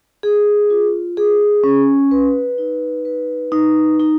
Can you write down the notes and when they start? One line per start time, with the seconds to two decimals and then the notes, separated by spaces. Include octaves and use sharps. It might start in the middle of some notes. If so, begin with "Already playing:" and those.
0.23 G#4
0.70 F4
1.17 G#4
1.64 C#4
2.11 B4
2.58 D#4
3.05 B4
3.52 D#4
3.99 D#4